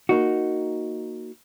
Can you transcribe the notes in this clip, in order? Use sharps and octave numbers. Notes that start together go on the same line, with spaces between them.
A#3 D#4 F#4